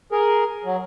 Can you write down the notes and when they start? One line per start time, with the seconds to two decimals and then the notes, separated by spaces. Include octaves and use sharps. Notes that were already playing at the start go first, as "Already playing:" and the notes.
0.12 G#4 A#4
0.64 F#3